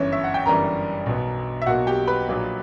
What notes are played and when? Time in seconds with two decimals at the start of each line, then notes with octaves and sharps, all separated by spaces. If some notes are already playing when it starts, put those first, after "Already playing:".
Already playing: G1 F#2 E3 C#4 C#5
0.12 E5
0.24 F#5
0.34 G5
0.46 G1 F#2 E3 G3 A#4 A#5
1.06 B1 B2 F#3 B3
1.62 E5
1.66 B1 B2 F#3 A#3 F#4 F#5
1.87 G4 G5
2.07 B4 B5
2.27 A#1 A#2 F#3 A#3